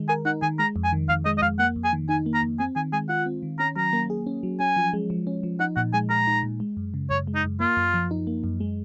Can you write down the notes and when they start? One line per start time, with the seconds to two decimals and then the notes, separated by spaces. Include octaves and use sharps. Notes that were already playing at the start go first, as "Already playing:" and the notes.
Already playing: D#3 G#3
0.09 A#4 G#5
0.25 D#4 F#5
0.42 D#3 G#5
0.59 G#3 A#5
0.76 F2
0.84 G#5
0.93 D#3
1.09 F2 F5
1.26 G#3 D#5
1.38 D#5
1.42 F2 F5
1.59 A#3 F#5
1.76 F2
1.84 G#5
1.93 D#3
2.09 D#4 G#5
2.26 A#3
2.34 A#5
2.43 F2
2.59 C4 G#5
2.76 D#3 G#5
2.93 G#3 G#5
3.09 F4 F#5
3.26 C4
3.43 D#3
3.59 C#4 A#5
3.76 F#3 A#5
3.93 A#3
4.10 G#4
4.27 C#4
4.43 F#3
4.60 C#4 G#5
4.76 F3
4.93 G#3
5.10 F3
5.27 C#4
5.43 F3
5.60 D#4 F#5
5.77 A#2 F#5
5.93 G#3 G#5
6.10 G#4 A#5
6.27 D#4
6.43 A#2
6.60 G#3
6.77 F#2
6.94 C#3
7.10 F#2 C#5
7.27 G#3
7.35 D#4
7.44 F#2
7.60 A#3 F4
7.77 F#2
7.94 F3
8.11 D#4
8.27 A#3
8.44 F#2
8.60 G#3